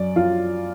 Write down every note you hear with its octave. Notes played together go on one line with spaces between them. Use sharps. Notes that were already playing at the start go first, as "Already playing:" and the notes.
Already playing: F#2 D5
F#2 F4